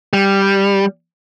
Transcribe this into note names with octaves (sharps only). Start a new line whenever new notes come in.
G3